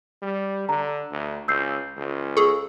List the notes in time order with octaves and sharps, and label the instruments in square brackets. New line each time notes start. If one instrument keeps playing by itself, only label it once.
[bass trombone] G3
[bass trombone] D3 [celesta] A#5
[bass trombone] D2
[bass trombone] C#2 [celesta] E6 G6 C7
[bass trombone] C#2
[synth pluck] G#4 A4 [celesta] C#6